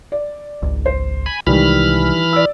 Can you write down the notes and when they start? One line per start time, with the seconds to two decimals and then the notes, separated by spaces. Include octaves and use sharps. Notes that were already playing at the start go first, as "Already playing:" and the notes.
0.12 D5
0.62 G#1 C#2 G#2
0.86 C5
1.26 G#5 B5
1.47 C2 C3 D#3 E3 G3 G#3 B5 F6
2.33 D5 E6